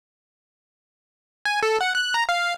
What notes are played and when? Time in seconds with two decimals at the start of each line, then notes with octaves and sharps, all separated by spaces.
1.45 G#5
1.63 A4
1.81 F#5
1.95 F#6
2.14 A#5
2.29 F5